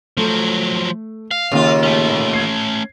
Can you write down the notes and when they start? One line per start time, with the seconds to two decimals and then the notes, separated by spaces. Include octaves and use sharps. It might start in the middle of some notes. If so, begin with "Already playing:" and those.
0.17 F3 F#3 A3
1.31 F5
1.52 D#2 C#3 A#3 F4
1.83 A3 C#4
2.33 G#6 C7